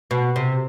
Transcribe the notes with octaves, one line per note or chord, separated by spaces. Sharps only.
B2
C3